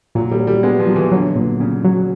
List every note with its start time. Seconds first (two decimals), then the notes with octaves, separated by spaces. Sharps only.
0.15 A#2 F#3
0.32 G3
0.39 F#3
0.47 G3
0.63 G#3 B3
0.80 F3
0.88 F#3
0.96 E3
1.12 D3 F#3
1.36 A#2
1.60 A#2 C#3
1.85 F#3